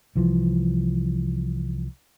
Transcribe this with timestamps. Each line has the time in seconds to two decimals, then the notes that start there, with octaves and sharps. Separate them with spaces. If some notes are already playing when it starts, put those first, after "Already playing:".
0.16 C2 E3 F3